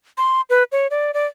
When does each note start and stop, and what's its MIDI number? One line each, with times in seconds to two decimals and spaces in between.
0.18 0.41 84
0.50 0.64 71
0.72 0.87 73
0.91 1.11 74
1.14 1.26 74